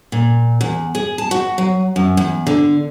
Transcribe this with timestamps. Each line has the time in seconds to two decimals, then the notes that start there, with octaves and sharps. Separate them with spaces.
0.12 A#2
0.61 E2
0.95 G#4
1.18 A5
1.31 F#4
1.58 F#3
1.96 F#2
2.17 E2
2.47 D3